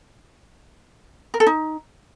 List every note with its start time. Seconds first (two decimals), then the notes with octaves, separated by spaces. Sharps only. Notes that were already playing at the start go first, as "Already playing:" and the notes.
1.34 A#4
1.40 A4
1.46 D#4